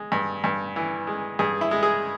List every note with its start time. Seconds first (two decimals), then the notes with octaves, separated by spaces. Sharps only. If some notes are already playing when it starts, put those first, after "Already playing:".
Already playing: G#3
0.12 G2
0.44 G2
0.76 E3
1.07 G#3
1.39 G2 G#4
1.61 E4
1.71 G#3
1.83 G#4